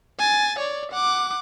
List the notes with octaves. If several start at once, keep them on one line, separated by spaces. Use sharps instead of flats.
G#5 A6
C#5 D5
F#5 D6